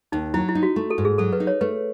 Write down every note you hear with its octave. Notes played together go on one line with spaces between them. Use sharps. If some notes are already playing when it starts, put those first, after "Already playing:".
D#2 D#4
F#3 E4
E4
D#4
F#4
A3
A4
G#2
G#4
F#3 A4
B4
D#4
C#5
A3 B4